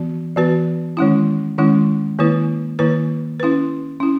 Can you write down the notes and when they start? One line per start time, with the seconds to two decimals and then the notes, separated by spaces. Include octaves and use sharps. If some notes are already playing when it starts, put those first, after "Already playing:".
Already playing: E3 B3 F#4
0.36 E3 B3 F#4 B4
0.97 D#3 G#3 C#4 E4
1.58 D#3 G#3 C#4 E4
2.19 D#3 A#3 E4 B4
2.79 D#3 A#3 E4 B4
3.40 C#4 E4 B4
4.00 C#4 E4